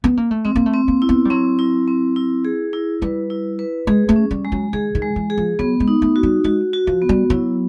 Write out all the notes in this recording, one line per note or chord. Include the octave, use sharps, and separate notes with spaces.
B3
A#3
A3
G#3 C4
A#3
A3
C4
A#3
E4
B3
G3
F#3 C4
E4
C4
E4
G#4
E4
G3 B4
E4
B4
G#3 G#4
A3
C#4
G3
G#3
F#3
D#3 G#4
D#3
G#3
E3
G#4
F3
F#3 B3
G#3
D#4
A3
F#4
G3
G#3 F#4
F#4
F3
B3
G3
F#3 E4